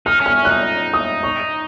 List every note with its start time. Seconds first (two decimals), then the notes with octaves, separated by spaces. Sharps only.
0.06 D#4 F6
0.20 C#4
0.26 F6
0.35 C#4
0.45 D#4 F#6
0.94 D#6
1.23 C#6